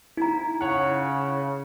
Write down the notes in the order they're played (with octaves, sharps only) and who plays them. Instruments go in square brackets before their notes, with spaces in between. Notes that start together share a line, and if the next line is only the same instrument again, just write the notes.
[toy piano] D#4 A#5 [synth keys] E4
[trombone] C#3 [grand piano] C#5 F#5